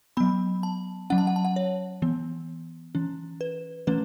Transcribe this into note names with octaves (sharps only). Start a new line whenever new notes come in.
F#3 B3 B5
A5
F#3 C#4 F#5
A5
F#5
A5
F#5
C#5
E3 B3
E3 C#4
B4
E3 A3 C#4 B4